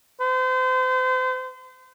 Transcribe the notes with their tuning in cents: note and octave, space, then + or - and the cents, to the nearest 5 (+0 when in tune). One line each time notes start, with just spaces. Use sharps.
C5 -35